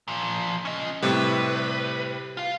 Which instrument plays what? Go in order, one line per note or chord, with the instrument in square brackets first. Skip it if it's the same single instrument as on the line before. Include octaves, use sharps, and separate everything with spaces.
[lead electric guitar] A#2 F3
C#4 D#5
[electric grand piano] A2 C3 G3 [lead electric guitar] B4
[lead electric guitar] F4 F5